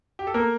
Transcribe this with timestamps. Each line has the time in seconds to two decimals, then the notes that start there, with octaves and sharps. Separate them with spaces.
0.19 G4
0.27 A4
0.34 A#3 A#4